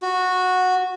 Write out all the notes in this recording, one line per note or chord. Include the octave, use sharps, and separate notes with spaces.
F#4